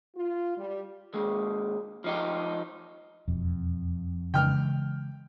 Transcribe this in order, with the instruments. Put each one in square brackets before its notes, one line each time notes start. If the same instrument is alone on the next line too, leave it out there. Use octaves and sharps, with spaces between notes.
[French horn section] F4
G3
[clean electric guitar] D#2 G#3
F3 D#4 G4
[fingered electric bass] E1 [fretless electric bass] F2
[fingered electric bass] C#3 E3 G#3 [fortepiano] G5 F6